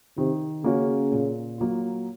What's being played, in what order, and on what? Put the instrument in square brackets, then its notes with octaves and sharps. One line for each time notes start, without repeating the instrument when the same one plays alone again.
[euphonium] C3 [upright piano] D#3
[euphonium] C#3 [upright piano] A#3 C#4 F#4
[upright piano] A#2
F#3 A#3 F4